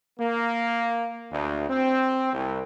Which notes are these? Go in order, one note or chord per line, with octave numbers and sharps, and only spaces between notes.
A#3
D2
C4
C2